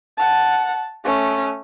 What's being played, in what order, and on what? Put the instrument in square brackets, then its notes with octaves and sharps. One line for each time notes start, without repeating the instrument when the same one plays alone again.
[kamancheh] F#5 A5
A3 C#4